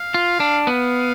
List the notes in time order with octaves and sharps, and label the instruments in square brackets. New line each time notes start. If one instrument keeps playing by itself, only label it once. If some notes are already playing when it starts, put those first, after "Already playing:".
Already playing: [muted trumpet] F5
[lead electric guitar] F4
D4
[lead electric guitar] B3 [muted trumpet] F5